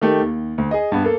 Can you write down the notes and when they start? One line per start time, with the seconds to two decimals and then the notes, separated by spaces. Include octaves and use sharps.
0.01 D#3 A3 G4
0.21 D#2
0.58 D2
0.71 G#4 D#5
0.92 G2 B3
1.05 A#3 A4